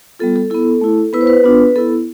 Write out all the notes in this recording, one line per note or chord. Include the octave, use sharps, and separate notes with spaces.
G3 B3 F4 A4
A4
B3 E4 A4
A3 E4
B3 E4 B4
C5
B4
B3 D4 F4
B3 E4 A4